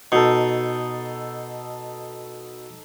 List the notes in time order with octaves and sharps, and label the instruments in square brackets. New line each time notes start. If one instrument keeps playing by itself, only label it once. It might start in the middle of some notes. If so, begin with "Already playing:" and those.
[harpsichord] B2 [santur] D#4 A4